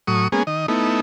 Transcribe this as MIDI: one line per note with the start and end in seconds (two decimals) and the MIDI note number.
0.07 0.28 45
0.07 0.28 54
0.07 0.28 85
0.07 0.28 87
0.32 0.43 56
0.32 0.43 58
0.32 0.43 59
0.32 0.43 61
0.32 0.43 68
0.47 0.66 51
0.47 0.66 75
0.68 1.00 57
0.68 1.00 59
0.68 1.00 63
0.68 1.00 64